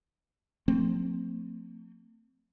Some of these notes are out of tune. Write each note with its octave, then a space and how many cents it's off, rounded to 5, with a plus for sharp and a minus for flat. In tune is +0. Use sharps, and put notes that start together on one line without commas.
F3 +35 A3 +45 C4 +0